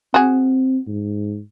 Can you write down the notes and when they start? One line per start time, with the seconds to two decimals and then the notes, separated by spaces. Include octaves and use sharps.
0.14 C4 F#4 G#4
0.88 G#2